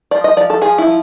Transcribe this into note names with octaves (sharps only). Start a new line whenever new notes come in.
F3 D5
D#5
F3 D5
A4
F3 G#4
E4
F3